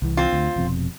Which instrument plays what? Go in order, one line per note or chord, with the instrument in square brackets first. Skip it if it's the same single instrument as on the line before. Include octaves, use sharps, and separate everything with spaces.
[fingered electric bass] C2 E3
[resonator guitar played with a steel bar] C4 F4
[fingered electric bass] D2
F1 F2 B2